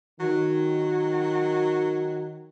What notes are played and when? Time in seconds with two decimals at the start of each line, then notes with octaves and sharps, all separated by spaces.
0.20 D#3 F#3